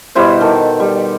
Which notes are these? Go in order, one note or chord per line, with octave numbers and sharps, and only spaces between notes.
B2 G3 E4 C5
D#3 A4
G3